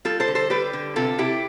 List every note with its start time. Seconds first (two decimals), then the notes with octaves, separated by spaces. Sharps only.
0.05 G3 F4 A4
0.20 A4 C5
0.28 D3
0.35 A4 C5
0.50 G3 G4 B4
0.73 D3
0.96 C3 F4 A4
1.18 C3 E4 G4